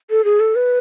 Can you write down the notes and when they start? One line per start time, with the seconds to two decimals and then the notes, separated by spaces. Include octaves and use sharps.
0.10 A4
0.25 G#4
0.40 A4
0.55 B4